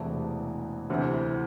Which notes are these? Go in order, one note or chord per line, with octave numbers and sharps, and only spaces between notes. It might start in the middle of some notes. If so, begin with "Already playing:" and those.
Already playing: E1 E2 C3 E3 A3
D2 C3 E3